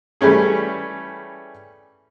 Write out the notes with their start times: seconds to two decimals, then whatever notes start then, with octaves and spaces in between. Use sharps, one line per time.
0.21 E3 G3 A3 C#4 G#4